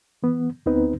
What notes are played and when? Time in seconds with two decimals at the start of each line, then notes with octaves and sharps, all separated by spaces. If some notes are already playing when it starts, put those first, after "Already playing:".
0.23 E3 B3
0.66 D2 B3 C4 D#4 B4